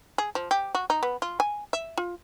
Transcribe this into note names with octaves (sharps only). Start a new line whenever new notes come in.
G#4
F3
G4
F#4
D#4
B3
F4
G#5
E5
F4